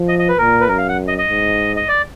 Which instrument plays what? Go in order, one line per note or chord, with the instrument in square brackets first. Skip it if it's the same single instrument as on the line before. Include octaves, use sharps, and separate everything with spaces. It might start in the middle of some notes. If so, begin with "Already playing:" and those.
Already playing: [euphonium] F3
[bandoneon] D#5
D#5
B4
[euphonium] A#2 [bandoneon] A#4
[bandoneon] B4
[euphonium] F#2 [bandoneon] A#4
[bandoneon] F5
F#5
D#5
D#5
[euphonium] G#2
[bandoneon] D#5
D5